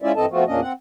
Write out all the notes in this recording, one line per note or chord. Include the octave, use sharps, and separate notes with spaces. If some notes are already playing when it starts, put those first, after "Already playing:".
G#3 C#4 E4 F4 D5 E5
G2 E3 C4 A4 D#5 A5
F3 A3 B3 C4 F4 F#4
E2 A#2 A#3 C#4 D4 D#5
C4 F#5